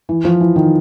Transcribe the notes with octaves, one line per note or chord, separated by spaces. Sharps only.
E3
F3
E3
D#3